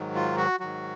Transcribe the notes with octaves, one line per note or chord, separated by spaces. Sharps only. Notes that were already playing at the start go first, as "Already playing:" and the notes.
Already playing: G#2 D#3 F#3
F4
F#4
G#2 D#3 F#3 F#4